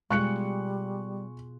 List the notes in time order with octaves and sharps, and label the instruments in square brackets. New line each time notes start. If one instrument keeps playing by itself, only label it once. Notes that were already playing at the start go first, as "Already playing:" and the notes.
[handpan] B2 F4 G#4 [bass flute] G3 [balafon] G#3 [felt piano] C#6 F#6 C#7